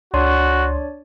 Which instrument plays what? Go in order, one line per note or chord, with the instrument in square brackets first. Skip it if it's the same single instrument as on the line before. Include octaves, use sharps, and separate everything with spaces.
[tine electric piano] C#2 C6 [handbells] D4 C#5 D5 [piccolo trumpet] F#4